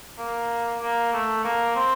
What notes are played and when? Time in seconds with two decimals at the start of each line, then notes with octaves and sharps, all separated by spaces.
0.18 A#3
0.80 A#3
1.13 A3
1.44 A#3
1.75 C4